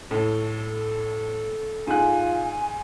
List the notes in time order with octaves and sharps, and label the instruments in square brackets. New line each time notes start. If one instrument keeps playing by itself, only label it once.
[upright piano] A2 [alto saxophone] A4
[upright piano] G#2 F#6 [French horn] F4 [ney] G#5